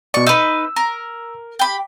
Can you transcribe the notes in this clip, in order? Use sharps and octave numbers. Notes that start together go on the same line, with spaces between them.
B2 D5 C#6
D#4 B4 E6
A#4
G4 B5